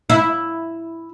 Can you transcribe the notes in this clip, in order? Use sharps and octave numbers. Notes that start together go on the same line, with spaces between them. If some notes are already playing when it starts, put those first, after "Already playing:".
E4